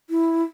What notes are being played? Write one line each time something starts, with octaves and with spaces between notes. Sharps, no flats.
E4